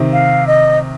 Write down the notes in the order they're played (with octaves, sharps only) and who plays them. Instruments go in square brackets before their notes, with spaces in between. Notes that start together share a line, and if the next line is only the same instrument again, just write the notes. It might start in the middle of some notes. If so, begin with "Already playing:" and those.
Already playing: [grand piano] C3 D#3
[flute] F5
D#5